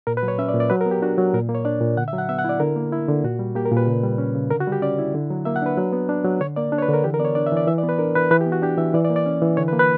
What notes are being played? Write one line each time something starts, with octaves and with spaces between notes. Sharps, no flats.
A#2 A#4
B4
F#3
C#5
C#4 E5
D5
A#2
D5
F#3 B4
A#4
B3
G4
D4 F#4
F#3
A#2 A#4
A#3
C#5
D4 D5
A#2
D3 F#5
E5
F#3
F#5
B3 E5
F#5
E4 D5
D3 A#4
A#3
E4
D3
A#2 F#4
G3
A#3 G4
A#4
A#2 B4
C#3
G3
C#4
C#3
D3 A#4
F#4
G3
G4
C#4 D5
E4
D3
F#3
A#3 E5
F#5
D4 B4
F#3
B3
D4
F#3
D3 C#5
A#3 D5
D4
C#5
B4
D3
A#4
E3 G4
A#4
B3 D5
C#5
D4 D5
E5
E3 D5
E3 E5
D5
B3
B4
D4 A#4
E3 B4
E3 B4
G4
B3
F#4
D4 G4
E3 E5
E3 D5
D5
A#3
D5
C#4
E3
D3 C#5
B4
A#3
B4